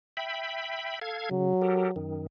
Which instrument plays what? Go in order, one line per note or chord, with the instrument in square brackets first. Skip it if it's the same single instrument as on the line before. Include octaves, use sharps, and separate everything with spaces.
[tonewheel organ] E5 G5 B5
A4 F5 G#6
[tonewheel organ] C#3 [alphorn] F#3
[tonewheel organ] G4 A4 A#4
F#2 D#3